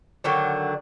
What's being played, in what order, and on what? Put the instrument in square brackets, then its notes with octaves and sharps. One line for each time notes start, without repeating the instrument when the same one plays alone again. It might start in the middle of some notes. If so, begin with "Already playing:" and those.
[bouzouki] D3 D#3 F#3 D4